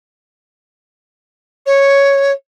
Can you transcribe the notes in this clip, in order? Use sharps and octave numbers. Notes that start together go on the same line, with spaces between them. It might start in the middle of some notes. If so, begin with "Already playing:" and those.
C#5